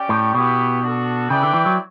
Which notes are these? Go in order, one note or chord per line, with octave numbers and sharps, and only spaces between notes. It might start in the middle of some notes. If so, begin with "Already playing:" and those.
Already playing: C#4 G4 D5 G5
A2
B2 B3 E4 G4
D4 F#4 A4
C#3 E4 B4 D5 G5
D3
E3
F#3